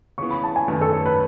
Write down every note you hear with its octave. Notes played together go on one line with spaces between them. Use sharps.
C#3 E3 B3 C#6
B5
A5
G#5
F#2 D#3 A3 C#4 B4
A4
A4
B4